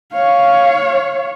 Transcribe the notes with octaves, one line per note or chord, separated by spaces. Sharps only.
C#5 F5